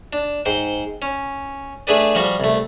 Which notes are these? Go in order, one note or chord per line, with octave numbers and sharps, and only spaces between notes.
D4
G#2 C5 G5
C#4
A3 D4 G#4 B4 D5
F3 G3 F#4
C2 A3